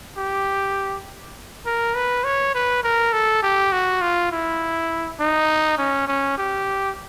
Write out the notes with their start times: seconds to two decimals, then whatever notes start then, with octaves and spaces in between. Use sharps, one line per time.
0.18 G4
1.66 A#4
1.96 B4
2.24 C#5
2.54 B4
2.83 A#4
3.12 A4
3.43 G4
3.72 F#4
4.01 F4
4.32 E4
5.20 D#4
5.78 C#4
6.07 C#4
6.38 G4